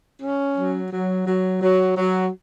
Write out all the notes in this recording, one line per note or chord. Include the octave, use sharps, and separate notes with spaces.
C#4
F#3
F#3
F#3
F#3
F#3